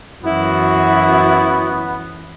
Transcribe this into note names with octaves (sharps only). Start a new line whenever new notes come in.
F#2 E3 B3 E4 F#4